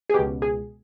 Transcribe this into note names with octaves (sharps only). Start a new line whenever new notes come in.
G#4
C#2 B2 G4
G#4